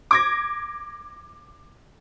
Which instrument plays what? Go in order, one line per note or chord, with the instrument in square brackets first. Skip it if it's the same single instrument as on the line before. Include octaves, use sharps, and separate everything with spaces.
[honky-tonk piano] D6 G#6 A#6